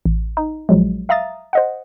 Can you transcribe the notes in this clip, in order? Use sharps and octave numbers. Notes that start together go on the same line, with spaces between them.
A1
D#4
A#1 F3 F#3 G#3
E5 F5 A#5 D#6 A6
C5 D#5 F#5